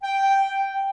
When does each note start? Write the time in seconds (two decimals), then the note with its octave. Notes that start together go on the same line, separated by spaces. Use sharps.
0.03 G5